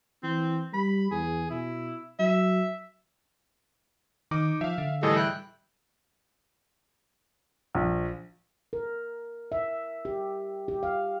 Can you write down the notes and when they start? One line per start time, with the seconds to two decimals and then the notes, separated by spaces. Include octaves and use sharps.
0.23 E3 C4
0.74 G3 B5
1.11 E2 G#4
1.50 B2 E4
2.19 F#3 E5
4.31 D#3 D#4 D6
4.61 F3 E5 F5
4.78 D3
5.03 A2 E3 G3 G#4 A4 D#5
5.16 G3 E4 G5 F#6 G6
7.75 A#1
8.73 A#4
9.52 E5
10.05 G4
10.68 G4
10.83 F5